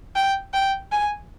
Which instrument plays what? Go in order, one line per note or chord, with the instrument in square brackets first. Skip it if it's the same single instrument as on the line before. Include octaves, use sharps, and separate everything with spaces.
[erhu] G5
G5
G#5